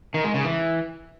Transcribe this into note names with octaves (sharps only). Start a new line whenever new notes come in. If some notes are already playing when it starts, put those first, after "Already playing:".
D#3
G#3
C#3
E3